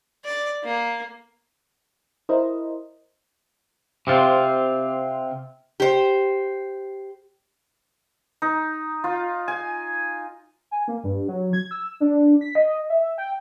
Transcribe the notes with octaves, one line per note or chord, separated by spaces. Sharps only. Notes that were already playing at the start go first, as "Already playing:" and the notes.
D5
A#3
E4 A#4 C5 D#5
C3 C4 F4
G4 C5
D#4
F4
G#5
G#5
A#3
G2
F#3
G#6
E6
D4
B6
D#5
E5
G5